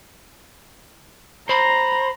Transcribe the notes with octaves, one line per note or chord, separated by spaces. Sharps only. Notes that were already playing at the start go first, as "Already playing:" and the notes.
C5 A#5 B5